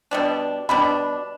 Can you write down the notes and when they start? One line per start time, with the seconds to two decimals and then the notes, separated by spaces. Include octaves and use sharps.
0.11 B2 G3 D4
0.69 B2 G3 D4 B5